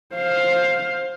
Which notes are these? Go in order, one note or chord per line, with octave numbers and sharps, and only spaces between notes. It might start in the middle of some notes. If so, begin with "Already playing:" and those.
C5 F5